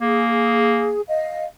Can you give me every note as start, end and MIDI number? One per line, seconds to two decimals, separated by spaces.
0.01 0.95 58
0.01 1.01 68
1.07 1.44 75
1.07 1.44 77